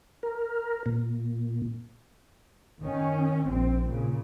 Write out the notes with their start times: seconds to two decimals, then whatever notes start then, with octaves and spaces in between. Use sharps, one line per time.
0.23 A#4
0.86 A#2
2.83 D#3 C#4
3.49 A#1 C4
3.91 A#2 C#3